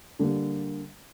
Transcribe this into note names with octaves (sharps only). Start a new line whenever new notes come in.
D3 G3 A#3